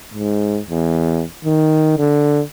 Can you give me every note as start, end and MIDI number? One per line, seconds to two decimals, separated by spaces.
0.14 0.60 44
0.70 1.23 40
1.45 1.95 51
1.98 2.42 50